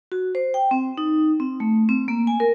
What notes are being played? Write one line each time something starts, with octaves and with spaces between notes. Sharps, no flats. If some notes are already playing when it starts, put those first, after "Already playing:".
F#4
C5
G5
C4
D#4
C4
A3
C4
A#3
G#5
A#4